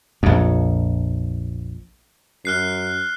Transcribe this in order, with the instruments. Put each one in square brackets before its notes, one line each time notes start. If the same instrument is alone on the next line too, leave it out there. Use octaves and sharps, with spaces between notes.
[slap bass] A#1 F2
[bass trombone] F#2 [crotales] F6 F#6 C7